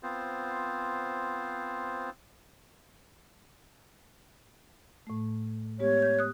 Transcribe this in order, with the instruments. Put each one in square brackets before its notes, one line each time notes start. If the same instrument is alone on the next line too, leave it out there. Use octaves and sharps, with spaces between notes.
[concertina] B3 C4 F4 C5
[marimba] A2 A3
[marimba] G#3 B3 G4 [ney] C#5
[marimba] G6
D#6 F#6